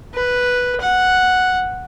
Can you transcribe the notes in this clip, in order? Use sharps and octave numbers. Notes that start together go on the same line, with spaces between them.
B4
F#5